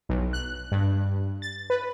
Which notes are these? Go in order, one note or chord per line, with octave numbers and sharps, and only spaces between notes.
B1
F#6
G2
A6
B4